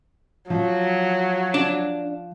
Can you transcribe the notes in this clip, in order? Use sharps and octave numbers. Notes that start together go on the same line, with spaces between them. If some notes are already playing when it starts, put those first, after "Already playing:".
F3 F#3
D4